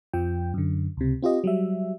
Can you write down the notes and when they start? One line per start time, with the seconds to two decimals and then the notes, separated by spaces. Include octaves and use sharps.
0.13 F2 F3 G5
0.54 F#2 D3
0.97 C#2 C3
1.22 C4 F4 G4 D#5
1.44 F#3 G3 E5